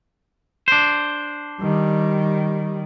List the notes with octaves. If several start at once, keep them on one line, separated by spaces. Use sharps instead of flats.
D4 C5
D#3 G3